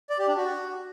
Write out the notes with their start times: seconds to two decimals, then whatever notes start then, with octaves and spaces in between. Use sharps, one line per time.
0.10 D5
0.19 G4
0.28 D4
0.37 F#4